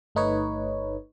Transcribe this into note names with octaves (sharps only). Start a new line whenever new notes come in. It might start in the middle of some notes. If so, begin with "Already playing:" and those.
G1 A3 D#4 B4 C#5